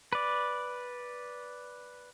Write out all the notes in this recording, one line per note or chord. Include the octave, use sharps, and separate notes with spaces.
B4 D5